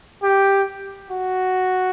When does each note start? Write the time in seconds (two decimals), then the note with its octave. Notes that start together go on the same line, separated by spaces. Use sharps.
0.23 G4
1.11 F#4